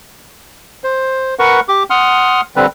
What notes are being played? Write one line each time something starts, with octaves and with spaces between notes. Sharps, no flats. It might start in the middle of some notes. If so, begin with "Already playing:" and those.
C5
A#4 B4 F#5 C#6
G4 D6
F#5 C6 D#6 F6
D3 G3 C4 B4